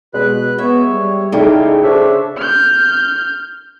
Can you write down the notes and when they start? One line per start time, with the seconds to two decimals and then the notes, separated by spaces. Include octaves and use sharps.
0.14 B2 G#3 F#4 B4 F#6
0.59 B3 C#5 E5
0.89 G3
1.32 C#3 A3 D#4 E4 D5 G5
1.83 D4 A4 C5 C#5 E5
2.37 F6 G6